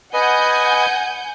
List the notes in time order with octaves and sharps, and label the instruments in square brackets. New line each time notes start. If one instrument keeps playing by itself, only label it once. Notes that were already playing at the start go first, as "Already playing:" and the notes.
[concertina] B4 D#5 [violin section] F#5 G#5 G6